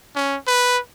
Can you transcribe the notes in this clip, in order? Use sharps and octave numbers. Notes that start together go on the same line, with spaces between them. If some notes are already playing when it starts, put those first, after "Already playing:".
C#4
B4